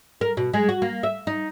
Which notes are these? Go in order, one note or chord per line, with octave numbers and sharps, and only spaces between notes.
A#4
B2
G#3
F#4
A#3
E5
D#4